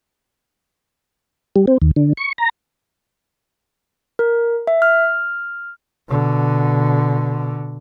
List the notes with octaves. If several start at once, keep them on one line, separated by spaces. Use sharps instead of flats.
G3
C4
D#2
D3
C#6
A#5
A#4
E5
F6
B2 D3